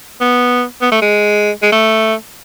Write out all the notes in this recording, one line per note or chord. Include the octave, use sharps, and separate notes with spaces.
B3
B3
A3
G#3
G#3
A3